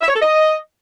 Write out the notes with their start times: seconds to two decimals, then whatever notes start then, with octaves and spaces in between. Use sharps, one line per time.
0.02 E5
0.08 C#5
0.15 A4
0.22 D#5